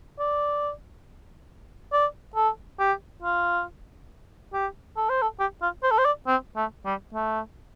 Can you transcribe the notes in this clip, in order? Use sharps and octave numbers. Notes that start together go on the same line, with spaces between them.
D5
D5
A4
G4
F4
G4
A4
C5
A4
G4
F4
C5
A4
C5
D5
C4
A3
G3
A3